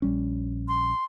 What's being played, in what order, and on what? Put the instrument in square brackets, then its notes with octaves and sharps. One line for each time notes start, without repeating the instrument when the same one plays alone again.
[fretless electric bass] A#1 G3 C#4
[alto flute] C6